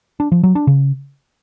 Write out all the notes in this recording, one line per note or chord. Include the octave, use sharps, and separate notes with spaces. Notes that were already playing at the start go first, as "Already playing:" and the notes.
D4
F3
F#3
D4
C#3